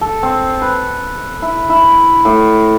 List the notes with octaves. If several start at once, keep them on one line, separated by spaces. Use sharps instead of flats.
A4
C4
B4
E4
E4
A2